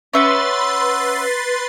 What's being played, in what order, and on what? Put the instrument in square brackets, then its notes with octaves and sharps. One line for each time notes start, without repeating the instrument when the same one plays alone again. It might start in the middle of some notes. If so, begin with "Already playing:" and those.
[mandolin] C#4 E5 F#5 [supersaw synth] B4 C6 A6